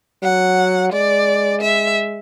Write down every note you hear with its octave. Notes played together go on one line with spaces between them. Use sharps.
F#3 F#5
G#3 D5
E5